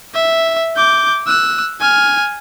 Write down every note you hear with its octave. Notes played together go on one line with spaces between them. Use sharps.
E5
D6 G6
E6 F#6
G#5 F6